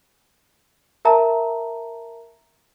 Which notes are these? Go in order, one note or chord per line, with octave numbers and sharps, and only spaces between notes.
A#4 E5 A5 A#5